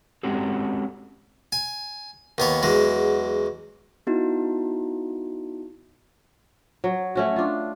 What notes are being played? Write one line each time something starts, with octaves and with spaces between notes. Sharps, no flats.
G#3 C4 C#4 F#4 G4 A4
G#5
D#2 B3 C#5
E2 F#3 G#3
B3 D#4 E4 F#4
F#3
A3 C#4 F#4
D4 F4